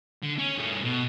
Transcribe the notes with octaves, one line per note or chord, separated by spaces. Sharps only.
D3
C#4
G2 A3
B2